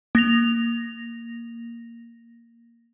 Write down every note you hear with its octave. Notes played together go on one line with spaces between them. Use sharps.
A#3 A#6 F7